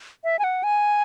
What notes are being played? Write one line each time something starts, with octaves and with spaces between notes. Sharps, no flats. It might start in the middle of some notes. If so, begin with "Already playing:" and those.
E5
G#5
F#5
G#5